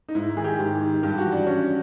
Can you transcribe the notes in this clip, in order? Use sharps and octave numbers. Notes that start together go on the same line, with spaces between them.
D#4
G#2 E4
D#3 G#4
G4
G#2 G4
D#3
G2 G4
F#4
E3
D4
G2 C#4